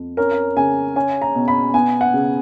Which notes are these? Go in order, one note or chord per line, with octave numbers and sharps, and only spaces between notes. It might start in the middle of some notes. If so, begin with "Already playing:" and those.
Already playing: F2
C#4 A#4
C#3 G#5
C#4 G#5
A#5
B2
B5
B3 G#5
F#5
C#3